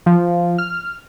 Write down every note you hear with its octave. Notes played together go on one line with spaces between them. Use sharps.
F3
F6